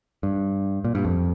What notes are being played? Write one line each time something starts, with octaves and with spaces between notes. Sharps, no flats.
G2
A#2
G2
F2